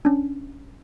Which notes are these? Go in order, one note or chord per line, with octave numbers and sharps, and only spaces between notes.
C#4 D4